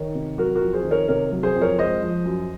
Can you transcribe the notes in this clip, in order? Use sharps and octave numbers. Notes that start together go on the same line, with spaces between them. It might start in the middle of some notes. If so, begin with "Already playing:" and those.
Already playing: D#3 A#4 C#5
C3
F#3 F#4 A#4
F#4 A#4
F2
G#4 C5
D#3
A#4 C#5
C3 A#4 C#5
F#3
G#4 C5
F2
A#4 C#5
G#3 C5 D#5
F3
F#2